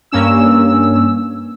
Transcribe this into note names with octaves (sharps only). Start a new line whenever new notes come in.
G2 A#3 C#4 E6